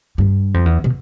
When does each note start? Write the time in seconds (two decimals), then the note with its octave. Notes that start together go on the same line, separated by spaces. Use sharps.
0.18 G2
0.54 F2
0.65 E2
0.84 B2